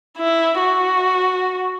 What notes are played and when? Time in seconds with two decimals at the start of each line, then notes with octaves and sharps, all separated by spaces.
0.18 E4
0.60 F#4